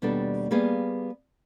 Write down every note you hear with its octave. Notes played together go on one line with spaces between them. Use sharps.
D#2 B2 G3 B3 D4 A4
G3 A#3 B3 G#4 F5